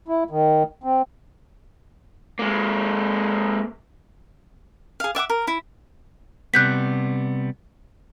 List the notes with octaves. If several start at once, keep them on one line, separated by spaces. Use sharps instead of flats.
E4
D#3
C4
G#3 A#3
G#4 F5
D5 E5 F#5 D6
A#4
E4
C3 G3 B3 F#6 G6 B6